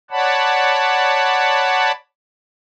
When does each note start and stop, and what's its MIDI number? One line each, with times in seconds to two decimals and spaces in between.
0.11 1.92 73
0.11 1.92 74
0.11 1.92 78
0.11 1.92 81
0.11 1.92 83